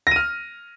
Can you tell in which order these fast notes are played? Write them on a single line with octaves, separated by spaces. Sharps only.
A#6 D#7 F6